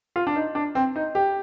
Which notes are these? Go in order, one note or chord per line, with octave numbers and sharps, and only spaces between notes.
F4
D4
D#4
D4
C4
D#4
G4